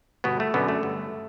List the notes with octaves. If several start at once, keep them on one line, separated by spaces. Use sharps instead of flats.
G1 B2 B3
A3
F#2 B2 D3 B3
A3
G1